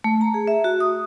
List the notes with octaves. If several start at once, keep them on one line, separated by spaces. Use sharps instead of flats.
A3
A#5
G#4
E5
F#4
D#6